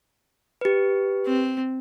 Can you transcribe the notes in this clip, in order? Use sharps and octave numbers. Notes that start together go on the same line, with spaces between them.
G4 B4
C4